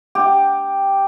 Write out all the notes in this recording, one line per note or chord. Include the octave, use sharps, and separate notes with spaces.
G4